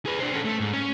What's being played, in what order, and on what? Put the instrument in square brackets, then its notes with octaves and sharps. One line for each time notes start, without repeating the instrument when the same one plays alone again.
[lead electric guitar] G#4 B4
D4 C5
C#4 A4
A3
G#2
C#4